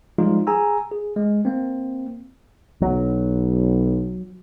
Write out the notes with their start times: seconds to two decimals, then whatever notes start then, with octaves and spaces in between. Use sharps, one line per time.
0.18 F3 G3 G#3 D#4 F4
0.47 G#4 G#5 A#5 E6
0.91 G#4
1.16 G#3
1.45 A#3 C4
2.82 B1 F#3